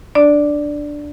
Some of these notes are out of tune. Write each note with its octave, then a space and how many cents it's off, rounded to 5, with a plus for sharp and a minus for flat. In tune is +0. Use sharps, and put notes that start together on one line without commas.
D4 +0 D5 +0